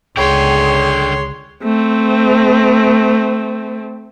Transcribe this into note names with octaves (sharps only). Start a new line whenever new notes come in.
C#2 D3 G#4 C#5 G5 C6
A3 C4